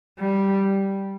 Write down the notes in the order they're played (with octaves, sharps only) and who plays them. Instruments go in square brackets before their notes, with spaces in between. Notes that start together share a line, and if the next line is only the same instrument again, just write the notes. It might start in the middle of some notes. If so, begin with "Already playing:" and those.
[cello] G3